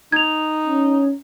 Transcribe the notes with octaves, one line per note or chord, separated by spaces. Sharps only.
D#4 G#6 F7
C#4